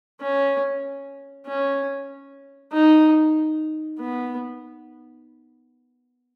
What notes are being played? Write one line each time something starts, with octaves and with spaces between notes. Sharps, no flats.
C#4
C#4
D#4
B3